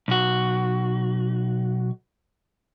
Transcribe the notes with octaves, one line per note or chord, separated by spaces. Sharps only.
B1 F#4